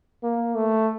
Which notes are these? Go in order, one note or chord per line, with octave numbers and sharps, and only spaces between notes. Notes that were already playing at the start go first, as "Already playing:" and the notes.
A#3
A3